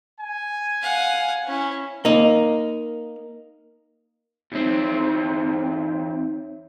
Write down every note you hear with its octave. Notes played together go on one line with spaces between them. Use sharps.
G#5
F5 F#5
C#4 E4
A#3 D#4
E2 C4 D#4 C#5 E5